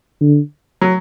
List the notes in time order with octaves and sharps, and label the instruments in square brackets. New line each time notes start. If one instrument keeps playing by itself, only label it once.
[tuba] D3
[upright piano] F#3